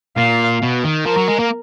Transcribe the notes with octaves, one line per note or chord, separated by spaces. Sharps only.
A#2 F5
B2
D#3
F3 A#4
F#3
G#3
A#3